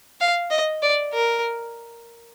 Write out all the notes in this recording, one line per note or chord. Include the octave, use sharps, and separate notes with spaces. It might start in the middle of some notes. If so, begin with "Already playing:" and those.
F5
D#5
D5
A#4